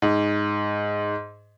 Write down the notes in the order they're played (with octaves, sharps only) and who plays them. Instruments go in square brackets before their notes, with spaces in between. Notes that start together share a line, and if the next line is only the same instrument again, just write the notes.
[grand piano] G#2